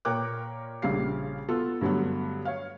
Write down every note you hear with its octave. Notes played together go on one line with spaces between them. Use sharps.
A#2 A#4 C#5 G5 D6 F#6
A#1 C#3 G3 F5 C7
B3 F4 A4
G2 D3 F#3 A3 B3
C#5 F5